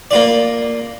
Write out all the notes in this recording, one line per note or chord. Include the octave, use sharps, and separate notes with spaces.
A#3 F4 D5